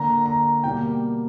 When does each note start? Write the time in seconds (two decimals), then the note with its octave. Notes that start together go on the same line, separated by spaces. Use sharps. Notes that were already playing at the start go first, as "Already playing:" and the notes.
Already playing: D3 A#3 A#5
0.26 A#5
0.64 B2 G3 A#3 G5